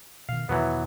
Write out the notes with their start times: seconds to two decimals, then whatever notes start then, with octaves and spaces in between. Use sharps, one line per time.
0.29 B2 D3 D#3 F5
0.49 E2 B2 D#3 E3 F#3 B3